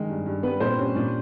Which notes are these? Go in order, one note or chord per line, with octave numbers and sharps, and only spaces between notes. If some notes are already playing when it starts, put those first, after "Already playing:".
Already playing: D#3 G#3
G2
G2
G3 B3 B4
A#2 C4 C5
G3 C#4 C#5
A#2 D4 D5